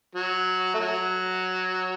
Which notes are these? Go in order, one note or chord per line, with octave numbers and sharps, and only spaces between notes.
F#3
A3
F#3